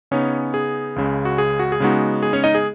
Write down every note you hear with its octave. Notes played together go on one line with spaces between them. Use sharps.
C#3 B3 C#4 D#4 C#5
G#4
C#2 C#3 G#3
F#4
G#4
F#4
G#4
C#3 G#3 B3 D#4 F#4
G#4
C#4 C#5
D#4 D#5
G#4